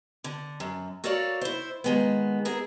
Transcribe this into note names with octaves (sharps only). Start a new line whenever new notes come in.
D3
F#2
F#4 A4 A#4 C#5 D5 F5
E4 C5
D#3 G#3 B3
E4 G#4 A#4